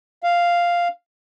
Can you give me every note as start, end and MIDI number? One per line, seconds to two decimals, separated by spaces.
0.23 0.88 77